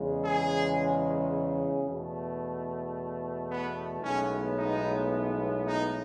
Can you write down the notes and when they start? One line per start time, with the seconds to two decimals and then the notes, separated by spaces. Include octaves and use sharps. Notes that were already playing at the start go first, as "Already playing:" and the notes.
Already playing: E2 C#3 G#3
0.23 G#4
1.86 E2 B2 A3
3.50 B3
4.03 B1 A2 G#3 B3 C#4
4.58 D#4
5.66 D#4